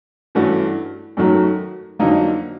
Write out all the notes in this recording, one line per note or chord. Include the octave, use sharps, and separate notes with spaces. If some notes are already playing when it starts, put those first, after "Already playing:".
G2 E3 A3 C#4 F#4
F#2 D#3 F#3 A3
F2 D3 F#3 A#3 D#4